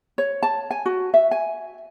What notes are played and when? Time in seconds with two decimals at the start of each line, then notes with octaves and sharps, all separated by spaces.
0.18 C#5
0.43 A5
0.71 G#5
0.86 F#4
1.14 E5
1.31 G#5